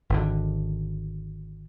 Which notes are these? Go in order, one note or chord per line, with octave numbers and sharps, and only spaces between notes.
G#1 D3